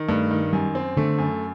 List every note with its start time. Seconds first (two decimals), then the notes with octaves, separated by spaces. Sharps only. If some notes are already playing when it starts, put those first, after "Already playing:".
Already playing: D#3
0.09 G2 A3
0.31 D#3
0.53 F#2 G3
0.75 C4
0.97 D3 A3
1.18 F#2